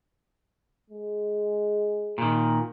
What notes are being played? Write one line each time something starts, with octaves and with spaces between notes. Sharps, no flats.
G#3
A#2 D#3